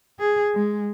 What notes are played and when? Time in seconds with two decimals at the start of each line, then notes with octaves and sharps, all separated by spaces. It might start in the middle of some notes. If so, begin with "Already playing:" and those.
0.19 G#4
0.54 G#3